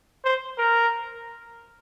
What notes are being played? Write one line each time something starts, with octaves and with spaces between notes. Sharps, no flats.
C5
A#4